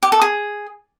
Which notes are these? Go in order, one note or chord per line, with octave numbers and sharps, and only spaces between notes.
G4
A4
G#4